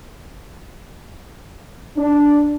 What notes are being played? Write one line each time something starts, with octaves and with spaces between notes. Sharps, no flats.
D4